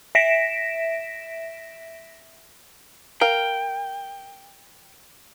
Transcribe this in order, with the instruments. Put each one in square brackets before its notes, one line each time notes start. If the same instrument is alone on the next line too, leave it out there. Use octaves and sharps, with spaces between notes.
[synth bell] E5 A#6 B6 D7 E7
[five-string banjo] A#4 F5 [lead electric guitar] G5